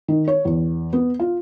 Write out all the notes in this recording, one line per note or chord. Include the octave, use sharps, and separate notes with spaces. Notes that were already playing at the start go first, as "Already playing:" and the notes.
D#3
C#5
E2
B3
F4